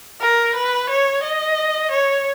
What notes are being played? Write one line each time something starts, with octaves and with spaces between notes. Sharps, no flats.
A#4
B4
C#5
D#5
C#5